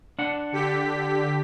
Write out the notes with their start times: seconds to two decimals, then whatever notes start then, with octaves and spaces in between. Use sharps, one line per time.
0.19 D4 F#5
0.52 D3 G4 B6